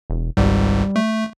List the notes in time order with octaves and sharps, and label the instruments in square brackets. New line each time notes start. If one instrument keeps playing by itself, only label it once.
[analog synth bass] E1
[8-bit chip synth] G#1 C#2 G#2 [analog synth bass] G3
[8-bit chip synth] A3